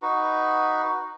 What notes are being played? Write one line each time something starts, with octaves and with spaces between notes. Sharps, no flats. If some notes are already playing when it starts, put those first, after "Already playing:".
D#4 F#4 B4